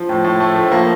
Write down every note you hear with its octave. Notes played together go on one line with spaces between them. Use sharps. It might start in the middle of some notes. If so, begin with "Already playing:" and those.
Already playing: F3
A2
A2
A3
F3
A#3